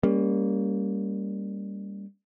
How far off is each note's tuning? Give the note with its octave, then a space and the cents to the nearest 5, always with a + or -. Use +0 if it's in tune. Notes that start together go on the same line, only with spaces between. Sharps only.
G3 +30 A#3 +0 C#4 +20